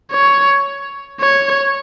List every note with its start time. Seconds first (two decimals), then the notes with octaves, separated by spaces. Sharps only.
0.11 C#5
1.21 C#5